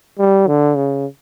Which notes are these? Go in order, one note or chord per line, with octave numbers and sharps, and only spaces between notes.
G3
D3
C#3